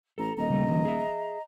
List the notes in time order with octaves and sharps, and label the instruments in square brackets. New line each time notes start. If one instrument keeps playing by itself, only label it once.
[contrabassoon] A1 [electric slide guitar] A4 [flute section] A#5
[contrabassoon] D#1 [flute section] D#5 A#5
[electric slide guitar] C#3 G3 A3
D3 E3 F#3
G#4 E5